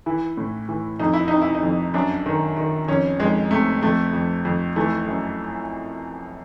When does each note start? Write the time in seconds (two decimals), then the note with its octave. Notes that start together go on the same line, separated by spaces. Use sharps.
0.06 E3 E4
0.37 A2
0.69 E3
0.99 F2 D#4
1.13 E4
1.28 C3 D#4
1.42 E4
1.55 D#4
1.63 F2
1.94 F#2 D4
2.26 D#3
2.57 D#3
2.88 F2 C#4
3.19 F2 G#3
3.51 C3 A3
3.82 F2 A3
4.13 F2
4.45 F2
4.76 E3 A3
5.07 F#2